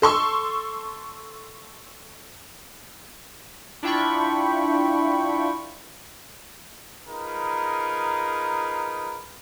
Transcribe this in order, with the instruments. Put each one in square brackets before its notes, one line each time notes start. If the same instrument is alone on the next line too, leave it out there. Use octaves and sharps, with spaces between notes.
[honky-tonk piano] A4 C6 C#6 E6
[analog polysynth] D4 E4 F4 G5 B5 C#6
[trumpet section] D#4 F4 G#4 A#4 B4